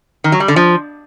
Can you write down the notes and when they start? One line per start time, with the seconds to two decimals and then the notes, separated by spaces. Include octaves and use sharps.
0.24 D#3
0.32 F#3
0.40 G3
0.48 D3
0.56 F3